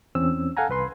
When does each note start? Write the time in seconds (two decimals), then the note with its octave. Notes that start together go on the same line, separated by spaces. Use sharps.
0.15 E2 C4 C#4 E6
0.57 A4 F5 F#5 G#5 A#5
0.69 C2 B4 C6